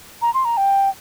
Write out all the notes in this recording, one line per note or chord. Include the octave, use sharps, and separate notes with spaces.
A#5
C6
A#5
G5